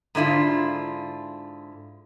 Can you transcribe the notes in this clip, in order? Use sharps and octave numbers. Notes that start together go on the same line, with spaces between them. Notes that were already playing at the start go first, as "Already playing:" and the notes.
G#2 D3 E4 F4